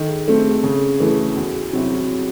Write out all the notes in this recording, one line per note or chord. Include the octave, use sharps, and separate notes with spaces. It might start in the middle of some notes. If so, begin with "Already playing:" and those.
Already playing: D#3 A4
G#4
A3 C4 A4
G#4
C#3 A4
E3 A3 G#4
G#4
E2 F#4
C3 F#3 C4 E4 F#4
G#4
F#4